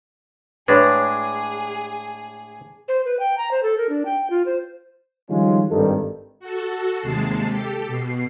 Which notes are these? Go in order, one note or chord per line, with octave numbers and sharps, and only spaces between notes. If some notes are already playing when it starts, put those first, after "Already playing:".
A2 G#3 D4 G#4 B4 C#5
C5
B4
G5
A#5
C5
A4
A#4
D4
G5
F4
C5
D#3 F3 G3 G#3 C#4 F4
G#1 G2 D#3 A4
F#4 A4
D#2 C3 G#3 A5 C7
G4 A4
B2 C7